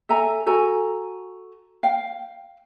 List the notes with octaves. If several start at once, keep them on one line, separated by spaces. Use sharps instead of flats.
A4 E5 G#5 A#5
F#4 A4 G#5 A#5
F5 G5